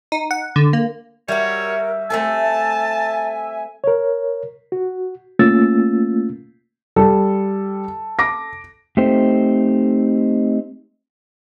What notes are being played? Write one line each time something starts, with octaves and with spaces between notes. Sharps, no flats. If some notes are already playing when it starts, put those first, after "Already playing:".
D#4
F#5
D3
A#3
G3 F#4 A#4 C#5 E5
A3 C4 A4 G#5 A5
A#4 C#5
F#4
A3 A#3 C#4 F4 E6 A6
G3 A4
D6 A#6
A3 C4 D#4 G4 A4 C5